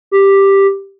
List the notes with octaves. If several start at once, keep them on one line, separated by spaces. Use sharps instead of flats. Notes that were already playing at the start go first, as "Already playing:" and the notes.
G4